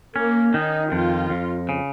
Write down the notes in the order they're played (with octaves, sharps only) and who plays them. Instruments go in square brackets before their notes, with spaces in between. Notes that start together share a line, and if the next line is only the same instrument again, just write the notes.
[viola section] A#3 [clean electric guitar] C#4
[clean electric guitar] D#3 [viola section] D#4
[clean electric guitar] F2 [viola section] F4
[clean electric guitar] F2
C#3